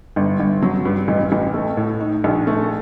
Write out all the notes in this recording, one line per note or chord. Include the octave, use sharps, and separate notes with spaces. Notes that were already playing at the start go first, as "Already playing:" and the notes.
G1
G1
F#3
G2
A1
A1
A3
A2
D#4
A#1
A3